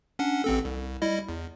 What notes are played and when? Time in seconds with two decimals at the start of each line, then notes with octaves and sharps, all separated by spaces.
0.19 C#4 D4 F#5
0.44 A1 C4 A4
0.65 C2
1.02 G3 E4 D#5
1.29 E2